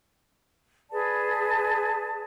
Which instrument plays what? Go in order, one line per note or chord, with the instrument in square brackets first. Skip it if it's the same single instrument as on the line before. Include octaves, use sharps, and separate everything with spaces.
[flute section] G#4 B4 D5 A5